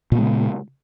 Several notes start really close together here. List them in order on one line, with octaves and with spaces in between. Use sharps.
A#2 B3 G#3 C#3